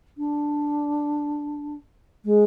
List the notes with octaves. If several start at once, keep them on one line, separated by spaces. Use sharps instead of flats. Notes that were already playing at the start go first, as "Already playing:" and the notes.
D4
G#3